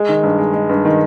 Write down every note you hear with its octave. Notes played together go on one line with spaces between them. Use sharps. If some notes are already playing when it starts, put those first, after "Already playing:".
Already playing: G#3
D#3
G2
G#3
G#3
G2
D#3